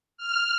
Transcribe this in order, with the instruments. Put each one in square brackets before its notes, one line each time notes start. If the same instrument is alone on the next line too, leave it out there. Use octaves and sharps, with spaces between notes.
[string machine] F6